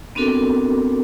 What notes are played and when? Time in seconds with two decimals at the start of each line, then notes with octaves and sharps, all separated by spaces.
0.15 B3 C4 D4 F#4 A4 A#4